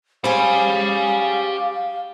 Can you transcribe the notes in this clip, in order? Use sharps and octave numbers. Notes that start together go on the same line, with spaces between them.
C#4 G4 G#4 C5 F5 G#5 B5